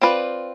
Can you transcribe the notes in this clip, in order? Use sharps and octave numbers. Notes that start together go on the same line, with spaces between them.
C4 F4 B4 D5